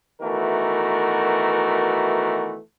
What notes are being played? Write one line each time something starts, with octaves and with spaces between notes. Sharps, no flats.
B2 D#3 E3 A3 F#4 A#4